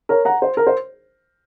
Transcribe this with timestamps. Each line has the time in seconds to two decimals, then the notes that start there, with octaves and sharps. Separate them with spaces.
0.09 A#4 C#5
0.25 F#5 A#5
0.42 C5
0.57 A#4
0.67 C5